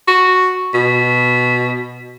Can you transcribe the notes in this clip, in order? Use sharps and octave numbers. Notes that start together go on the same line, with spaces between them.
F#4
B2